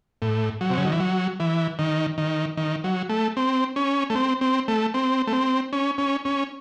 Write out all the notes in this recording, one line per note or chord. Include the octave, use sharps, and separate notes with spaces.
A2
F#3
C3
C#3
D#3
E3
F#3
E3
D#3
D#3
D#3
F#3
A3
C4
C#4
A3
C4
C4
A3
C4
A3
C4
C#4
C#4
C#4